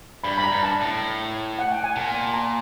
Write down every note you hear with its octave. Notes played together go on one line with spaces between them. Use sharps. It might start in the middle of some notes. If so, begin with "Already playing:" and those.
G2 B5
B5
A#5
G2
A5
A2
F#5
G5
G#5
A#2 A5
A5
A#5